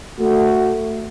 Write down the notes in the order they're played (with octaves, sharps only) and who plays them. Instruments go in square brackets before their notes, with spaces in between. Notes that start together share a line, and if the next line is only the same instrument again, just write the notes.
[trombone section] A3 F#4